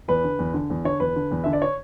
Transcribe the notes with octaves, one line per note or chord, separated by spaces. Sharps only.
E2 B4
D3
E2
D3
E2
D3 C#5
E2 B4
D3
E2
D3 E5
D5
C#5